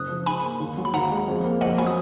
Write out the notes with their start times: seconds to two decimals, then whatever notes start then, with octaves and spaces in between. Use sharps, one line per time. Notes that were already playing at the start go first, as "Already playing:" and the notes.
Already playing: F#1 D#6 F#6
0.09 F3
0.26 G#2 G#5 B5
0.43 A#3
0.60 D#2
0.78 F#3
0.85 B5
0.94 D#2 F#5 A#5
1.11 G#3
1.28 F2
1.44 A#3
1.61 F2 D#5 F#5
1.78 F#3 G#5 B5
1.86 D#6